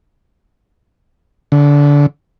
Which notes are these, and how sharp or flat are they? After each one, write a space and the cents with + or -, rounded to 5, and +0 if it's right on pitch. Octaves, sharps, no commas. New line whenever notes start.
D3 -25